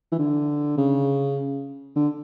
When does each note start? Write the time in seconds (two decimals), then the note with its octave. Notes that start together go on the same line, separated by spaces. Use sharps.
0.12 E3
0.19 D3
0.78 C#3
1.96 D3